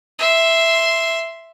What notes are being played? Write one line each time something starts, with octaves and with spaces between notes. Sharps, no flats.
E5 C6